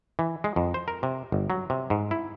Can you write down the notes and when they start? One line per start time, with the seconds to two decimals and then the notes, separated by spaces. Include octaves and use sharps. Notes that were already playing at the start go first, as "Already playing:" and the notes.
0.19 E3
0.44 G#3
0.56 F2
0.74 C5
0.88 A#4
1.03 C3
1.32 G1
1.50 F#3
1.70 C3
1.90 G#2
2.11 E4